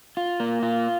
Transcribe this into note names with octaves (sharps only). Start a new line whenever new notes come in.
F4
A#3
F4